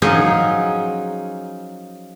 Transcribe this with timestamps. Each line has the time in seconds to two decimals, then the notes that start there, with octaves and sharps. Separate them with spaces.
0.02 F3 F#3 C#4 D#4 G#4